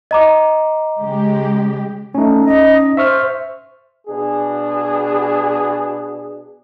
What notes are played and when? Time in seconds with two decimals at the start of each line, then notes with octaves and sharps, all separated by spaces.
0.11 D#5 A#5 D6
1.00 C#3 G#3 G4
2.15 A3 C#4 D#4
2.44 D#5
2.97 C5 E5 C#6 F6
4.08 B2 D4 G#4